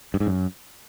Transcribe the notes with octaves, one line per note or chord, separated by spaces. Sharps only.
G2
G#2
F#2